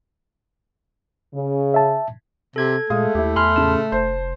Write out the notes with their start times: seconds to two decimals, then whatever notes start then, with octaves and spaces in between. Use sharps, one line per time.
1.35 C#3
1.74 E5 A5
2.56 C3 A4 G#6
2.90 A#2 G#3 A3 F5 D#6
3.15 D#2 E4 G4
3.36 E2 G#5 B5 C6 F6
3.56 A2 C#3 A5
3.92 F1 C5